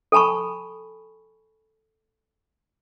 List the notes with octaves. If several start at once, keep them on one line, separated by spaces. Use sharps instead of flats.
A4 G#5 A5 B5 C#6